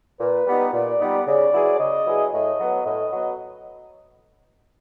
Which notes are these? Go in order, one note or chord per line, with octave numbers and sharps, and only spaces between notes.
A#2 B4
G3 B3 D#4
A#2 D5
G3 B3 D#4
C#3 D5
F#3 B3 E4 G#4
C#3 D#5
F#3 B3 E4 G#4
A2 D#5
F#3 B3
A2 D#5
F#3 B3